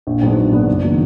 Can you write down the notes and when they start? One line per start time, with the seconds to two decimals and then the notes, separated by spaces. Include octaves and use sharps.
0.07 A#1
0.22 G#2 F#3 B3 D4
0.38 A#1
0.52 G#2 F#3 B3 D4
0.68 F#1
0.83 D#3 F#3 D4